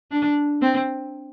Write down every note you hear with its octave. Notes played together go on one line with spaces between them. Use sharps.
D4
C4